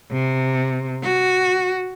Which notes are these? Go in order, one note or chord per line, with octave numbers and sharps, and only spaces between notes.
C3
F#4